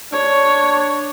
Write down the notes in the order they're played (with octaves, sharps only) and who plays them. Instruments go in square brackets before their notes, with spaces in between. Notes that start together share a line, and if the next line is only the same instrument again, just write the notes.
[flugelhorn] D4 [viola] C#5